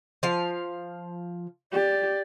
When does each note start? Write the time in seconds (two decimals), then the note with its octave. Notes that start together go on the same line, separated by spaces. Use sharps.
0.23 F3 F5
1.72 G4 D5